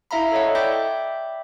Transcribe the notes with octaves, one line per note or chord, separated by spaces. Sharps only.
E4 E5 F5 A#5 B5
A4 C#5 D#5 F#5
D5 E5 G5 B5 D6 G6